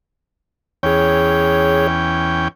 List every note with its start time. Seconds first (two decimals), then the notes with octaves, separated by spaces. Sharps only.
0.83 E2 C#4 G#4 C#5 G5